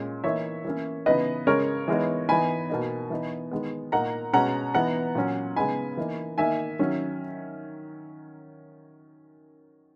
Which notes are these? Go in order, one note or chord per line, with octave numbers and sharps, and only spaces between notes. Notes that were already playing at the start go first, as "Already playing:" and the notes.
Already playing: A#2 G#3 C#4
E3 A#3 D#4 C#5 E5
E3 A#3 C#4
C#3 E3 B3 D#4 B4 D#5
C#3 G#3 C#4 A#4 C#5
E3 G#3 B3 D#4
E3 B3 D#4 G#5 B5
B2 A#3 D#4
E3 B3 D#4
D#3 G#3 B3
A#2 A#3 D#4 F#5 A#5
B2 G#3 C#4 F#5 A#5
E3 B3 D#4 F#5 A#5
A#2 F#3 C#4
C#3 G#3 B3 D#4 G#5 B5
E3 A#3 D#4
D#3 A#3 D#4 E5 G#5
D#3 F#3 C#4